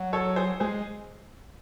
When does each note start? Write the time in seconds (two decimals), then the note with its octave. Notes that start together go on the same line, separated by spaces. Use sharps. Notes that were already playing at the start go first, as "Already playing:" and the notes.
Already playing: F#3
0.13 A4 C#5
0.36 G#4 C5
0.60 G#3 G#4 C5